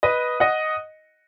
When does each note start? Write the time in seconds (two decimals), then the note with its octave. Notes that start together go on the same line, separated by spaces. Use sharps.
0.03 B4 D#5
0.40 D#5 F#5